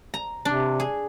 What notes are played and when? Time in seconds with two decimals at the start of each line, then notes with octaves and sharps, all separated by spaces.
0.14 A#5
0.45 C3 D4
0.80 G#4